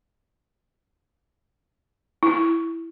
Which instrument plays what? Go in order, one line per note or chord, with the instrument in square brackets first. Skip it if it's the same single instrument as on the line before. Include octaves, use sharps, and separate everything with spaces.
[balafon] E4